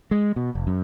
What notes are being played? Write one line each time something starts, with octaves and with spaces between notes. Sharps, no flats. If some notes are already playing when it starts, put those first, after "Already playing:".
G#3
B2
F1
F#2